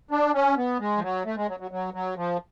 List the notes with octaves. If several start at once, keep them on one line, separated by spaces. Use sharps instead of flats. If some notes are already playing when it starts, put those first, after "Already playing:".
D4
C#4
B3
G#3
F3
F#3
A3
G#3
F#3
F#3
F#3
F#3
F3